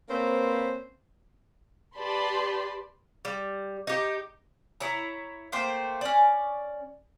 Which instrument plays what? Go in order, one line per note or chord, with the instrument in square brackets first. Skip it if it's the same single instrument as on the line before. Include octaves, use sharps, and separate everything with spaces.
[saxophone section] A#3 C4 C#4 B4 C5
[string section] G4 B4 D5 A5 B5 C6
[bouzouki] G3
D#4 G4
E4 C#5 A#5
A3 A#3 C5 G5
C#4 D5